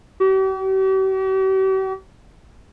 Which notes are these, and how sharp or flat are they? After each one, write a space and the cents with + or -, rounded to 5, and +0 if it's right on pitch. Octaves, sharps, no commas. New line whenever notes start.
G4 -45